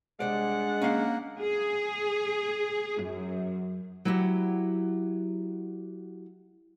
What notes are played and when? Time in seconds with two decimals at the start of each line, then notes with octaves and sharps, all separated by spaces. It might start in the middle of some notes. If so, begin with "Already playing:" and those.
0.20 C2 G#3 D4 C5 D5 F#5
0.82 A#3 C#4 F5
1.39 G#4
3.01 F#2
4.05 F#3 E4 G4 F#5